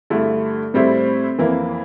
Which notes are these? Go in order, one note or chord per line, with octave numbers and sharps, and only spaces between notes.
G2 D3 A3 E4
A2 G3 C4 E4
F2 E3 A#3 E4